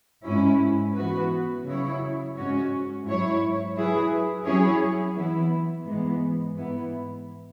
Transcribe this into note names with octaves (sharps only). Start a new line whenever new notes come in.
G#2 G#3 C#4 E4
E3 B3 F#4 B4
C#3 F#3 E4 C#5
G#2 G#3 C#4 F#4 C#5
G#2 F#3 E4 C#5
F#3 E4 G#4 B4
F#3 C#4 E4 G#4 C#5
E3 B3 E4
G#2 E3 G#3 B3
G#2 E3 B3 E4